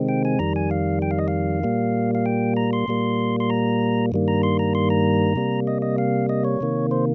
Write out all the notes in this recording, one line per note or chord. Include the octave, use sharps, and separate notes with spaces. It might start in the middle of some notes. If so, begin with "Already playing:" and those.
Already playing: C3 D#3 G#3 C4
G5
G#5
F2 D#3 G3 A#5
G#5
F5
G5
F5
D#5
F5
A#2 G3 A#3
F5
G5
A#5
C6
A#2 G3 A#3
C6
A#5
G2 D#3 G3 A#3
A#5
C6
A#5
C6
A#5
C3 G3 A#3
D#5
D#5
F5
D#5
C#5
C3 D#3 A#3
C5